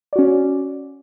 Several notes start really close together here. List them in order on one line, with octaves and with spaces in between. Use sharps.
D5 F#4 C#4